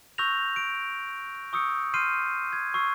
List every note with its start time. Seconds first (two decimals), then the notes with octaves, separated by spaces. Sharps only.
0.18 C#6 E6 F#6 G6 A#6 F7
0.56 D7
1.53 C#6 D#6 E6 G6 C#7
1.94 C6 F6 G6 C7 D#7
2.53 G#6
2.74 C#6 E6 C7